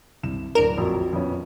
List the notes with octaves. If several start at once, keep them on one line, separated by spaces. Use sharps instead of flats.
C2 E7
D1 D4 A#4 E7
A#1 F2 F#3
F2 B3 C#4